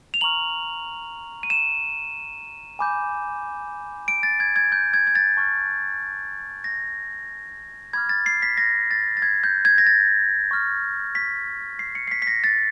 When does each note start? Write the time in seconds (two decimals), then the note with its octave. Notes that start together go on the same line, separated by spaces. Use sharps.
0.14 F7
0.21 A#5 C#6 F6 F#7
1.43 D#7
1.50 E7
2.79 G#5 B5 D6 G6
4.08 D7
4.23 A6
4.40 G#6
4.56 G#6
4.72 G6
4.94 G#6
5.07 G#6
5.15 A6
5.37 A5 C#6 F6
6.64 A#6
7.93 B5 D6 F6 G#6
8.09 A6
8.26 C7
8.42 B6
8.57 A#6
8.91 A6
9.17 A6
9.22 G#6
9.44 G6
9.65 G#6
9.78 A#6
9.87 A6
10.51 C#6 F6
11.15 B6
11.79 C7
11.95 C#7
12.08 C7
12.12 B6
12.22 B6
12.27 A#6
12.44 A6